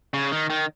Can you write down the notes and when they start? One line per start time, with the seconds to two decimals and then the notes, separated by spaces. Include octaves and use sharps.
0.14 C#3
0.32 D#3
0.50 D#3